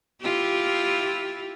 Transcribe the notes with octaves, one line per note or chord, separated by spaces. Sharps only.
E4 F4 G4